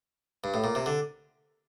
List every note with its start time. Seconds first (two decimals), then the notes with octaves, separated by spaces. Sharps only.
0.44 G2
0.54 A2
0.64 A#2
0.75 C3
0.86 D3